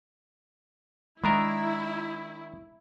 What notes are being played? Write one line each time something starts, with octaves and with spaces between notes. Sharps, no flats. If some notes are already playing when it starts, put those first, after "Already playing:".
D#3 G#3 D4 E4 A#4 E5 A#5 B5